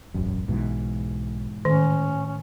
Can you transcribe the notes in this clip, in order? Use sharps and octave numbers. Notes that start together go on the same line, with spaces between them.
E1 A1 F#2
B1 G#2 B2 E3
A2 D#3 C#4
C#4